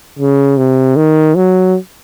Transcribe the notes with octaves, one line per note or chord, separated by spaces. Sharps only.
C#3
C3
D#3
F#3